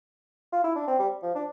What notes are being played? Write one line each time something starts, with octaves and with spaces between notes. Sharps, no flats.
F4
E4
D4
C4
G3
F3
D4